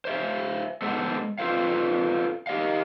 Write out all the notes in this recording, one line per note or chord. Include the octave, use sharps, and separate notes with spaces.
C5 E5 F5
G#3 B3 A4 C5 F#5
F4 A4 B4 C5 F5
G4 D#5 F5